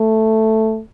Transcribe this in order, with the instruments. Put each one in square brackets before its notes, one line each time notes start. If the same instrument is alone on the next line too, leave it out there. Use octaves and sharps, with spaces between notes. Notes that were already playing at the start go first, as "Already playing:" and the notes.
Already playing: [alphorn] A3